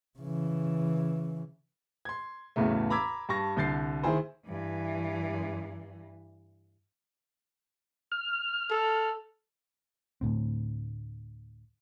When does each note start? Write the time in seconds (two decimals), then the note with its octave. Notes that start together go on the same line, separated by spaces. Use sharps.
0.19 C#3 E3
2.05 C6 G#6
2.56 B1 E2 A2 C#3 A3
2.90 A#5 B5 D6 E6 G#6 B6
3.29 G2 A5 C#6 A#6
3.56 C2 D3 G6 A6 C7
4.03 D#3 E4 G#4 C5
4.46 G2 E3
8.12 F6
8.70 A4
10.21 D2 A2 C4